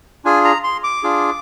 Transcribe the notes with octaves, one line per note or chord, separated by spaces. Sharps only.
D4 F4 G#4 G#5
A#5
C6
D6
D4 F4 G#4